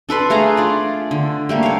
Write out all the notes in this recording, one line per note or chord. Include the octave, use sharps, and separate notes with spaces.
D4 A4 B4 C6
A3 G#4 F5 A#5
F4 D5
D3
G3 A3 A#3
C#5 F5